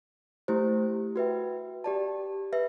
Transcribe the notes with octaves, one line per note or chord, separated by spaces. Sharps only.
A3 E4 G4 C5
F#4 B4 E5 G5
G4 D5 A5
B4 E5